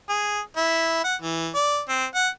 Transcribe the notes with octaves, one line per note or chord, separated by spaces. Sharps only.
G#4
E4
F#5
E3
D5
C4
F#5